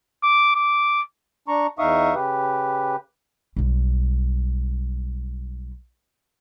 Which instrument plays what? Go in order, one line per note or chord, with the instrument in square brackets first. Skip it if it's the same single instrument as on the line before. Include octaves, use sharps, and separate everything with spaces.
[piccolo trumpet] D6
D6
[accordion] D4 A#5 C#6
E2 D#4 E5 F5 C#6 D#6
C#3 G4 B4
[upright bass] B1 G3